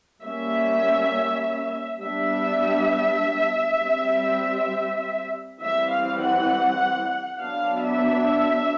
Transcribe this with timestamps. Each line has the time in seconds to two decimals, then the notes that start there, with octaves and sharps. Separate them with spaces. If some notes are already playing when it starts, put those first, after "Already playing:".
0.23 G3 A#3 C#4 E5
2.03 G3 B3 D4 E5
3.82 G3 C4
5.61 E3 G3 C4 E5
5.91 F5
6.21 F#5
7.40 F#3 B3 D4 F5
7.85 E5